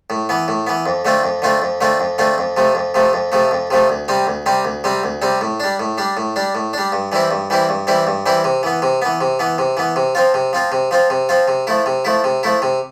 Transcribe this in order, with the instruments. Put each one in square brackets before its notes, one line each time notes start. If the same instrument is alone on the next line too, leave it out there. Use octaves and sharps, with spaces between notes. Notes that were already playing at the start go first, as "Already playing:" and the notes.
[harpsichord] A2
E3 B3
A2
E3 B3
F2
D3 A3 C4 F4
F2
D3 A3 C4 F4
F2
D3 A3 C4 F4
F2
D3 A3 C4 F4
F2
C3 F3 A3
F2
C3 F3 A3
F2
C3 F3 A3
F2
C3 F3 A3
D2
C3 G3 C4
D2
C3 G3 C4
D2
C3 G3 C4
D2
C3 G3 C4
A2
G3 D4
A2
G3 D4
A2
G3 D4
A2
G3 D4
G2
E3 G3 C4 E4
G2
E3 G3 C4 E4
G2
E3 G3 C4 E4
G2
E3 G3 C4 E4
C3
E3 B3
C3
E3 B3
C3
E3 B3
C3
E3 B3
C3
F3 C4 F4
C3
F3 C4 F4
C3
F3 C4 F4
C3
F3 C4 F4
C3
F3 A3 E4
C3
F3 A3 E4
C3
F3 A3 E4
C3